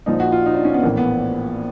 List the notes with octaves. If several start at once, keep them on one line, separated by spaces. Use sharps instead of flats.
A#1 A#2 F3 D#4
F#4
F4
D#4
D4
C#4
B3
A#1 A2 E3 A#3
B3